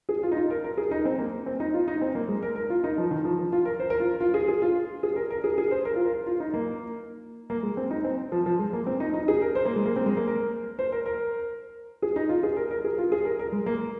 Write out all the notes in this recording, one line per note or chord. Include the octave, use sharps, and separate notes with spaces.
G#4
F4
D#4
F4
A#4
A#4
G#4
D#4
C4
A#3
C4
D#4
F4
D#4
C4
A#3
G#3
A#4
A#4
F4
D#4
F3
D#3
F3
F3
F4
A#4
C5
A#4
F4
F4
G#4
G#4
F4
G#4
A#4
A#4
G#4
G#4
C5
A#4
F4
A#4
F4
D#4
A#3
A#3
G#3
C4
D#4
C4
F3
F3
G#3
A#3
C4
D#4
D#4
G#4
A#4
C5
A#3
G#3
A#3
C4
G#3
A#3
A#4
C5
A#4
A#4
G#4
D#4
F4
G#4
A#4
A#4
G#4
F4
G#4
A#4
A#4
G#3
A#3